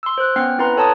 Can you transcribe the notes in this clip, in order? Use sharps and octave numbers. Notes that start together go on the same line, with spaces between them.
C6 E6
C5 F#6
B3 C#4 F#5 G5 F6 C7
C4 E4 B4 F#5 A#5 C6
A4 C#5 A5 A#5 D#6